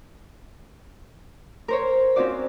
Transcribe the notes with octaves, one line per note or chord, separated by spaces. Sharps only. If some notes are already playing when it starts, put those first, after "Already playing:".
A#4 C5 C#5
C4 C#4 D#4 F4 F#4 D5